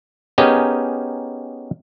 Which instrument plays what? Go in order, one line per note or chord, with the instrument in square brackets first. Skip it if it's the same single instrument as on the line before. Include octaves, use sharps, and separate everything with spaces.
[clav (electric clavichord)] B3 C#4 D#4 G4 G#4 A#4